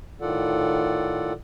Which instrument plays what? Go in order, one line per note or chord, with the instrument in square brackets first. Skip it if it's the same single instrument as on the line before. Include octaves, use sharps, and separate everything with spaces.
[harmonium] A2 D#3 F4 A4 D5 F#5